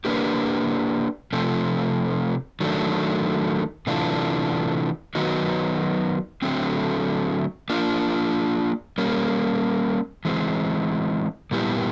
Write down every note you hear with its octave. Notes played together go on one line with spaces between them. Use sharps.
A#3 D4 G4 B4
C3 F3 A3
D#3 F#3 A3 D4
C3 E3 A3 D4 F4
D#3 F#3 B3 D#4 F#4
D3 F#3 A3 C4
A#3 D4 F4
G3 A#3 C#4
E3 G#3 C4
A#2 G3 B3 E4 G4